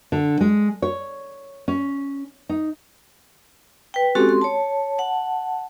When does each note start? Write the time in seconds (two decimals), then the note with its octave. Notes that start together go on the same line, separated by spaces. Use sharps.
0.12 D3
0.41 G#3
0.82 C#5
1.68 C#4
2.49 D#4
3.94 B4 G5
4.15 G#3 C4 C#4 F#4 G4 A4
4.29 C6
4.42 C#5 A5
4.98 F#5 A5